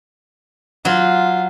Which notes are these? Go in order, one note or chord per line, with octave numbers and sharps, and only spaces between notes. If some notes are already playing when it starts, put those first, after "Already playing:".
F#3 F4